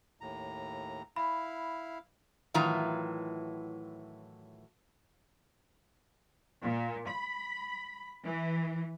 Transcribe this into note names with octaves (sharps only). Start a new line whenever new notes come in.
D#2 A2 A#5
E4 F5 B5
A2 D#3 E3 F#3 F4 A#5
A#2
B5
E3